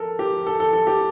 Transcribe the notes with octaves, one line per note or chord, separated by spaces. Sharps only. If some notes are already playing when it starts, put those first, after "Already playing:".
Already playing: A4 A#4
G4
A4
A4
A4
G4